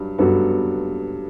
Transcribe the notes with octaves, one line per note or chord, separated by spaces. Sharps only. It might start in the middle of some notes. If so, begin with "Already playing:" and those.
Already playing: G2 F#3
G2 F#3 B3 F#4 A4